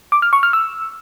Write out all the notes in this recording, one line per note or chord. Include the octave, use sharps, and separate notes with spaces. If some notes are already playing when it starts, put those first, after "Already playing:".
D6
F6
C#6
F6
E6